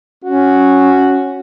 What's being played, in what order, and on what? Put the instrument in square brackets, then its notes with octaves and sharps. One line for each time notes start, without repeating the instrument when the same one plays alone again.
[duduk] C#4 [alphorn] F#4